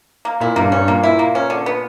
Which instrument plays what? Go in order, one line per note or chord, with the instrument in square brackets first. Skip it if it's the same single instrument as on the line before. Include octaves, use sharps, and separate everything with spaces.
[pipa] A#3
[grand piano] A#2 [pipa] E4
[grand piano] G2 [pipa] A#3
[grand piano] G2 [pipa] C#4
[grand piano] A#2 [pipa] A#3
[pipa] E4
A#3
C#4
D3
B3